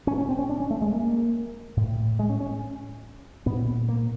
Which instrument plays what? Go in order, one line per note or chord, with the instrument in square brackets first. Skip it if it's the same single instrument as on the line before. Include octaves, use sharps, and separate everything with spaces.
[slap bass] A#2 C#4
C#4
C4
C#4
D4
C#4
A3
G#3
A#3
A2
G#3
C#4
C#4
A#2 B3
A#3